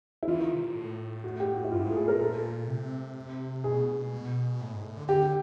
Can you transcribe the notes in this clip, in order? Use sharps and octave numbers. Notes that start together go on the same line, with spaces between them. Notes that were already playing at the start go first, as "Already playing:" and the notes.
E4
E3 F4
D#3
C3
A#2
A2
F#4
G4
F#4
E4
G2 F4
G#2
A4
A2 G#4
A#2 A#4
A4
C3
B2 G#4
A2
G#2
A2
D3
D3 G4